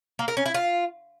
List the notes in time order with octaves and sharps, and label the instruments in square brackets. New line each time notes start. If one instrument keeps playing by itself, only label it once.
[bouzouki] A#3
A#4
C#4
E4
F4